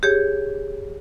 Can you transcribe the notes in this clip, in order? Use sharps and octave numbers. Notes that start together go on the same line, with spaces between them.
G4 G#4 C#5